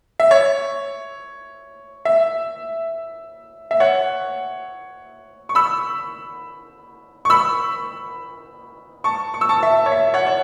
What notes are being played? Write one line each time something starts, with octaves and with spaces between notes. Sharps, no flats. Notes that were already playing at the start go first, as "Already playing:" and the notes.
E5
C#5
E5
E5
C#5 F#5
C#6
B5 E6
C#6
B5 E6
A5 C#6
C#6
E6
A5 C#6
E5 A5
C#5
E5
C#5 F#5
C#5